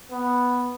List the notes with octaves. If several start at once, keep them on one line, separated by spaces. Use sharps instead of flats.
B3